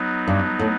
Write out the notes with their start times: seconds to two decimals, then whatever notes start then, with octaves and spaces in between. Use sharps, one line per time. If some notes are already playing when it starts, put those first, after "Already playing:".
Already playing: F#3 B3 D#4
0.28 G2
0.59 A2